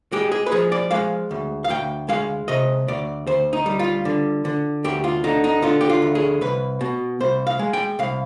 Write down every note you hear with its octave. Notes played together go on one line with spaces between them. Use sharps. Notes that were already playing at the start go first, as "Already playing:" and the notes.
G#3 G4
G#4
B4
F3 G#4
D5
G#3 F5
D2
F5
D2 G5
G#3 F5
C3 D#5
D2 D5
D2 C5
D#4
G3
F4
D3
D3
D2 G4
F4
D3 D#4
D#4
D3 F4
G4
F4
D2
G#4
C2 B4
B2
C2 C5
F5
G#3
G5
C2 F5